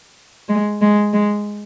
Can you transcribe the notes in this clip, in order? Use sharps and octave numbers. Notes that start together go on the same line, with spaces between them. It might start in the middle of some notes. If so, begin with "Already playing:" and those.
G#3
G#3
G#3